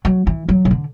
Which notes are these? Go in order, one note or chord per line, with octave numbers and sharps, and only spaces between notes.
F#3
E3
F#3
C#3
D3